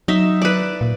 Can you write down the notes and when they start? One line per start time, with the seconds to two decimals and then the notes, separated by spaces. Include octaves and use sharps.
0.08 F#3 D#4 E5
0.41 B4 D5
0.81 A#2